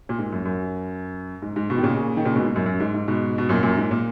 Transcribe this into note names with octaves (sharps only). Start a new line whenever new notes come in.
A#2
G#2
F#2
F#2
G#2
G#2
G#2 B2
D#3
A#2 C#3
D#3
A#2 C#3
G#2 B2
G#2
F#2
F#2
G#2
G#2
G#2 B2
B2
F#2 A#2
F#2 A#2
G#2
A#2